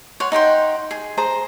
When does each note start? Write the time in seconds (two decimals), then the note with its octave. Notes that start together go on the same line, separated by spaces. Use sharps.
0.20 C#5 F#5 C6
0.32 D#4 F#5 G5 C6
0.91 G#4
1.17 G#4 C5 A#5